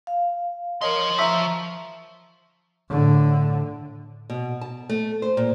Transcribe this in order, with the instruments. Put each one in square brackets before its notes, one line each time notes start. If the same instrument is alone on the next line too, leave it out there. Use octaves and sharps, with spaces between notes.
[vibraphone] F5
[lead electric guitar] F3 C6 [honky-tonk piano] A#4 C#5 D#5
[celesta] E5 E6 B6 [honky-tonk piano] A#5 C#6
[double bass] A2 D3
[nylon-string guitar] B2
A5
A3
C5
A#2